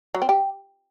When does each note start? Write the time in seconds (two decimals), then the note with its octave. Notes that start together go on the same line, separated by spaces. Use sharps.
0.15 F#3
0.22 C4
0.29 G4